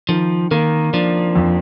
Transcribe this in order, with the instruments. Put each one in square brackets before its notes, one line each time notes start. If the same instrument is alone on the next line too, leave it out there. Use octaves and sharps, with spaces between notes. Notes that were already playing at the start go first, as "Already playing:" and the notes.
[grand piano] D#3 [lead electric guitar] F3
[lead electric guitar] D#3 [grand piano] A#3
[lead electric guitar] F3 [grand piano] D4
[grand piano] F2